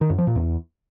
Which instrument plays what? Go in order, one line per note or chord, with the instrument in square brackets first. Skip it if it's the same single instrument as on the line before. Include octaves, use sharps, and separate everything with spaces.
[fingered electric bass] D#3
F#2
F3
A#2
E2